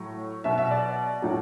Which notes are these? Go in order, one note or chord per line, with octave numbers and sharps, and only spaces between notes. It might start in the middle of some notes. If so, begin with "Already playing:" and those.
Already playing: A2 F#3
B2 F#3 E5
E5
D5
A2 F#3